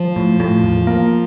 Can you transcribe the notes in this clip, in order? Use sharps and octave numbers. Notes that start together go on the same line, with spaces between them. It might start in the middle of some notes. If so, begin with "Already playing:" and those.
Already playing: F3
A2
A2
E2
A#3